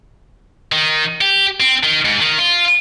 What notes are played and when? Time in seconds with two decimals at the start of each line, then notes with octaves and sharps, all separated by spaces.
0.72 D#3
1.21 G4
1.60 C4
1.83 D#3
2.05 G#2
2.21 D#3
2.39 F4